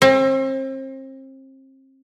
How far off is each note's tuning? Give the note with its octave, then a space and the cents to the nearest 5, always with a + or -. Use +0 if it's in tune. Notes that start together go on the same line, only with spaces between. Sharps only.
C4 +35